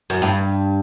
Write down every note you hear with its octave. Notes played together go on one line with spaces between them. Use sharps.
F#2
G2